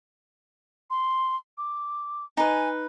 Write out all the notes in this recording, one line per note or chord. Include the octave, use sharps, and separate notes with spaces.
C6
D6
D#4 B4 G#5